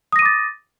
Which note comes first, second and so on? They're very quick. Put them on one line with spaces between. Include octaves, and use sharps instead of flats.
D#6 A#6 D#7 D6 A6